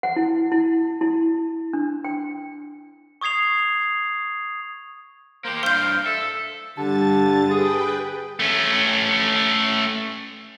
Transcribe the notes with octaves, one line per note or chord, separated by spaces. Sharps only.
F#5
E4
E4
E4
D4
G5
C#6 D#6 G#6 C7 F7
A#3 G4 C5
G2 C5 F5 C6 G6
A4 E5
G2 D3 G4 A5 A6
G#4 B4 G5
A3 C#4